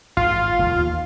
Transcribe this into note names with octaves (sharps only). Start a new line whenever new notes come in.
G#1 F4
E1 D#2 F3
D#2